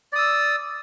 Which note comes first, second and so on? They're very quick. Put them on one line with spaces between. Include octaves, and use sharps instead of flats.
D5 D#6 E6